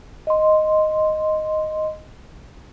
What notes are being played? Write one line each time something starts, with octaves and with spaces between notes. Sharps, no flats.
D#5 C6